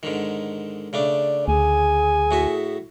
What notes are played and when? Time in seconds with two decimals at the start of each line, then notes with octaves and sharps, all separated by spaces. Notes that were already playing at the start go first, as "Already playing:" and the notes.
0.03 G#2 D3 D#3
0.93 C#3 A3 D4 D5
1.48 D2 G#4 G#5
2.31 A2 F#4 E5